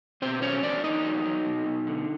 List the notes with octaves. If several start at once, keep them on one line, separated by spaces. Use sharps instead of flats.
B2 C4 C5
F#3 C#4 C#5
E2 D4 D5
E2 D#4 D#5
F#3
F#3
B2
B2
D3